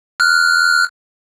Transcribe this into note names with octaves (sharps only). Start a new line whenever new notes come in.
F6 F#6